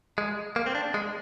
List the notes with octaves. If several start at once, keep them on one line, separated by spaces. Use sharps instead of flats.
G#3
A#3
C4
D4
G#3